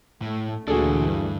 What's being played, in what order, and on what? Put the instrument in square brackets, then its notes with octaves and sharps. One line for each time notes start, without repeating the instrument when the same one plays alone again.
[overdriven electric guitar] A2 [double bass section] A3
[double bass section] D2 D3 E3 [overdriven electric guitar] A#2 D4 [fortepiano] F#4 G#4 A4
[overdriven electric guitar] G2